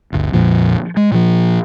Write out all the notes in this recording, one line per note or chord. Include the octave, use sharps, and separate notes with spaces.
G1 D2
A#1 F2 A#2 F3
G#3
A#2 F3